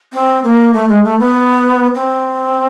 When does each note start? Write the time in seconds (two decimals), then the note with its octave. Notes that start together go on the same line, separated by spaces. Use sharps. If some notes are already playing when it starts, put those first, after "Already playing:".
0.13 C4
0.44 A#3
0.74 A3
0.89 G#3
1.04 A3
1.19 B3
1.95 C4